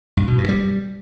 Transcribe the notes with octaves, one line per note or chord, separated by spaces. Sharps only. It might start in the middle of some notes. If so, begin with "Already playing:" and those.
G2
B2
G2
G3